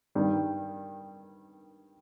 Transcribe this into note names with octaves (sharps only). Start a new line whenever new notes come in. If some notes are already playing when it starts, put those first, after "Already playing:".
G2 D#3 G3